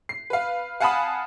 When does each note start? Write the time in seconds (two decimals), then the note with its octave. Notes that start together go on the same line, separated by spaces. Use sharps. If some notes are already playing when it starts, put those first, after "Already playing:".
0.09 C7
0.30 B4 F5
0.80 F5 F#5 G#5 A5 B5 D#6